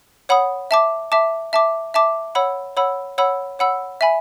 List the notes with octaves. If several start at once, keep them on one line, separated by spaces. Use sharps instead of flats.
C#5 F#5 B5 D#6
E5 A5 D6
E5 A5 D6
E5 A5 D6
E5 A5 D6
C#5 F#5 B5 E6
C#5 F#5 B5 E6
C#5 F#5 B5 E6
C#5 F#5 B5 E6
E5 G#5 B5